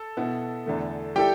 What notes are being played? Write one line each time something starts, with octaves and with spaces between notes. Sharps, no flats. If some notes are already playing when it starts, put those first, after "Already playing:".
Already playing: A4
B2 B3 E4
E2 D3 A3
G3 E4 G4 A4 G5